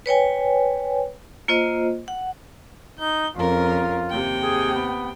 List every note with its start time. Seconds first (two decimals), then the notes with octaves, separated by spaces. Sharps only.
0.06 B4 C#5 G5 G#5
1.48 A#3 F4 C5 D#5
2.08 F#5
2.99 D#4 G6
3.35 F2 C#3 F4 A#4
4.10 D#2 C3 G5
4.43 G#4
4.75 B3